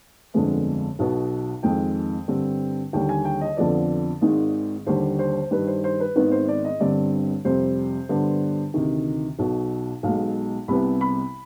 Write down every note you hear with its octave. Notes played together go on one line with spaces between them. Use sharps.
G1 F2 D3 G#3 B3
B1 B2 B3
F2 D#3 G#3 G5
G2 D3 G3 C4
D#2 D3 G3 G5
G#5
G5
D#5
F2 D3 F3 B3 D5
G#1 G#2 D#3 G#3
D#2 D3 G3 C5
C5
G2 D#3 G3 B4
C5
C5
B4
G#1 G#2 D#3 B3 B4
C5
D5
D#5
G1 G2 D3 G3 C4 D5
F2 C3 G3 C4 C5
G2 D3 G3 B3
D2 C3 D#3
B1 B2 B3
B1 B2 G#3 F5
C2 C3 G3 B3 B5
B5